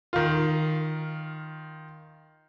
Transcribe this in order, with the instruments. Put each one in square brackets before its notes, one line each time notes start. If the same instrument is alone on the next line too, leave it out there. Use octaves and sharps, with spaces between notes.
[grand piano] D#3 F4